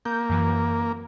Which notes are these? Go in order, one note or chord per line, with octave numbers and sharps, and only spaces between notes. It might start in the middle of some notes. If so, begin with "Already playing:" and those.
A#3 G6
F#2 E3